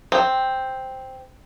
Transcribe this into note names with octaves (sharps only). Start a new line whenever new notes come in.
C4